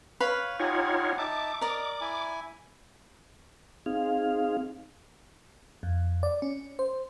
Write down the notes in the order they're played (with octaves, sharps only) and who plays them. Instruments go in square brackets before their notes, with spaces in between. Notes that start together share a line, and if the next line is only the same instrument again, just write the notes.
[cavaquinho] B4 F5 B5 [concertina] C#5
[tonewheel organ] D#4 F4 C#5 [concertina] G4 F#5 G#5
[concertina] D#4 E5 A5 [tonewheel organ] D6
[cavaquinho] A#4 D5 [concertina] D#5
[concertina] E4 G#5
[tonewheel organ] C4 D#4 G#4 F5
[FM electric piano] F2
D5
C#4
C5